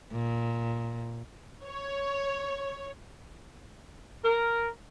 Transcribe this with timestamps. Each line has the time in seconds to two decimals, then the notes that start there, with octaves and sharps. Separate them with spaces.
0.13 A#2
1.66 C#5
4.24 A#4